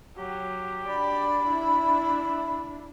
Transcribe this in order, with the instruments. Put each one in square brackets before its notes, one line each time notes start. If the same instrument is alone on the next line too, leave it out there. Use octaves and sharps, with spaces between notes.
[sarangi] F#3 [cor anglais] G4
[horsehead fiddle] D4 [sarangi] D5 [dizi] B5
[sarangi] E4 [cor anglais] E5